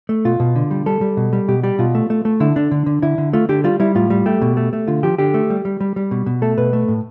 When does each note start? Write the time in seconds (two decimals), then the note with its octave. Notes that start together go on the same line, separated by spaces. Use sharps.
0.09 A3
0.25 B2 F4
0.40 B2
0.56 D3
0.71 G3
0.86 G3 A4
1.01 G3
1.17 B2
1.33 G3
1.48 B2 G4
1.63 G3 G4
1.79 B2 F4
1.95 A3
2.10 A3
2.25 A3
2.40 D3 E4
2.56 D3 D4
2.71 D3
2.86 D3
3.02 D3 E4
3.18 D3
3.33 A3 F4
3.49 D3 G4
3.64 G3 F4
3.80 G3 E4
3.95 A2 F4
4.10 G3
4.26 A3 G4
4.42 B2
4.57 A3
4.73 A3
4.88 D3 F4
5.03 F3 G4
5.18 D3 G4
5.34 A3
5.50 G3
5.65 G3
5.80 G3
5.96 G3
6.11 B2
6.26 B2
6.42 A3 A4
6.58 B2 B4
6.73 A3
6.88 A2